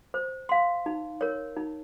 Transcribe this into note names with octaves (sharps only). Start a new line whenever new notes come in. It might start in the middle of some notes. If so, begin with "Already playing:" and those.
C5
F5 C6
D#4
A#4 C#5
D#4